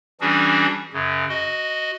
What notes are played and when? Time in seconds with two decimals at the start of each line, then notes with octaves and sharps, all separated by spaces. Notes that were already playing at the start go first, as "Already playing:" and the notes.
0.21 E3 G3 C#4 D4 F#4 G#4
0.93 F#2 C#3
1.29 F#4 D#5